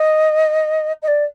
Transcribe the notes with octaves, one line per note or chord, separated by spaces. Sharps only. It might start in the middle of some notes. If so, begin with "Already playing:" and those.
Already playing: D#5
D#5
D5